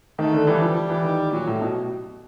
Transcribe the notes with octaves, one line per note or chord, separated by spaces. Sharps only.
D#3 A3
D3
E3 G3
F3
E3
D#3
A#2 F#3
A2
B2